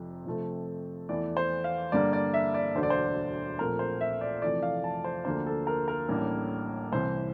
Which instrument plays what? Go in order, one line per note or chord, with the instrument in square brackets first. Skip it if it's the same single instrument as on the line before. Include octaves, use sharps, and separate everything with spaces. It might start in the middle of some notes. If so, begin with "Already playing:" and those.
Already playing: [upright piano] F1 F2 C3
F2 C3 F3 A3 C4
E2 E3 A3 D5
C5
F5
G2 D3 G3 A#3 D4 D5
D5
E5
D5
E1 D2 D3 C5
D5
C5
A#1 A#2 A3 C4 A#4
C5
E5
D5
F1 F2 E3 A3 D5
F5
A5
C5
D2 D3 F3 A#3 D4 C5
A4
A#4
A#4
A1 A2 G3 A#3 D4
C2 C3 E3 C5